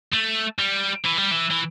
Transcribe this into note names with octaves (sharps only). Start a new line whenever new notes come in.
A3
G3
E3
G3
E3
E3